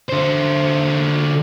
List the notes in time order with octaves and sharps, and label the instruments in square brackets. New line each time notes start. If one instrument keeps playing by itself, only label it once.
[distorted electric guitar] D3 C5